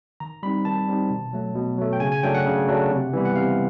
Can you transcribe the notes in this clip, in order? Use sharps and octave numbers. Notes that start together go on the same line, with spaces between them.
D#3 A#5
G3 C4 D#4 B5
D#3 A5
G3 C4 D#4
B2
F#3 A3
B2
F#3 A3
G5
C#3 G#5
G#5
F#3 A3 D4 G5
F#5
C#3
F#3 A3 D4
C3
E3 G3 B3 E4
F#5
C3 F5